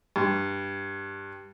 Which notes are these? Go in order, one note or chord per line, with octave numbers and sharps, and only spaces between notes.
G2